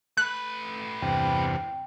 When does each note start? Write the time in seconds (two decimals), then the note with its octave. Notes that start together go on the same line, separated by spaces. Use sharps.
0.17 A3 B4 F#6
1.02 E2 G2 C3 G5